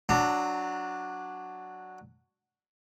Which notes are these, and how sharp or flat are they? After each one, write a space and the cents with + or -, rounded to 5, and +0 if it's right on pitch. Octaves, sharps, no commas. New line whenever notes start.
F#3 +0 D4 +0 A#5 -35